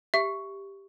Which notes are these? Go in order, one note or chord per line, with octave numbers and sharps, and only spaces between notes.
G4 E5